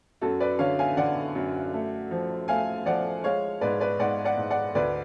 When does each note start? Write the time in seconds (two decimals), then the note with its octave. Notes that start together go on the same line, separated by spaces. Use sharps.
0.21 F#2 F#4 A4
0.40 B4 D5
0.59 D3 C#5 F5
0.79 F5 G#5
0.97 D3 D5 F#5
1.35 F#2
1.73 A3
2.11 F3
2.48 A3 F5 G#5
2.86 F3 D5 F#5
3.24 G#3 C#5 F5
3.61 G#2 B4 D5
3.80 B4 D5
3.99 G#2 D5 F#5
4.25 D5 F#5
4.37 G#2
4.50 D5 F#5
4.75 D2 B4 D5